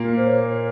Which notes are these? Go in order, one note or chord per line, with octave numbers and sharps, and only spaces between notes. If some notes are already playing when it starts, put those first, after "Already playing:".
Already playing: A#2 A#3
C5
C#5